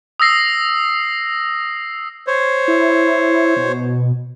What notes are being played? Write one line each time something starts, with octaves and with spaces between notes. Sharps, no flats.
D#6 E6 A#6 C7
C5 C#5
E4
B2